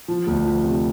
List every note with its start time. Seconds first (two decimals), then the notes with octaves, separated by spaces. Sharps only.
0.08 F3
0.27 D2
0.45 F3
0.64 C3